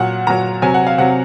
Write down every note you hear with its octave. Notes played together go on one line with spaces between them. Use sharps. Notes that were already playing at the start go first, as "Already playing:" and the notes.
Already playing: A#2 F#3 F#5
A#2 F#3 A#5
C3 F#3 G#5
F#5
F5
C3 F#3 F#5